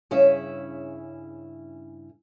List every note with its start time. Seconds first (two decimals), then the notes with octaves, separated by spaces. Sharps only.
0.11 G2 C#3 C#4 E4 G#4 E5